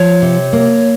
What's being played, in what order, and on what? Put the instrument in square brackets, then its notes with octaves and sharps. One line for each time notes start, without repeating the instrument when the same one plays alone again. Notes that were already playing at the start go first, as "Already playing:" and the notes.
Already playing: [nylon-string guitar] F3 [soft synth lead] C#5
[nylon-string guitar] C3
A#3